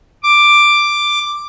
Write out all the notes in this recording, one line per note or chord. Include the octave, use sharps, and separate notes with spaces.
D6